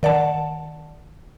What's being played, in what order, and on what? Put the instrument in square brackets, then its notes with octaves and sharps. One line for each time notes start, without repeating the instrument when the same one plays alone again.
[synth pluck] D#3 D5 F#5 A5